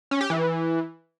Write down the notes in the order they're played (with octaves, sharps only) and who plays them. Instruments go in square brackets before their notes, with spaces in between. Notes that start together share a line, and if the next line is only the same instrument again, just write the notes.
[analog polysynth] C#4
G4
E3